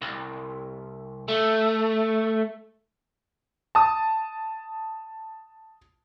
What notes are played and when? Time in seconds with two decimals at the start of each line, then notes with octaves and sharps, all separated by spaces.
0.02 C2
1.28 A3
3.75 A5 D#6